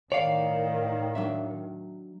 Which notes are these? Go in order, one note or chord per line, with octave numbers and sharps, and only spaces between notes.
A2 D#3 C#5 D5 F5
F#3 D4 E5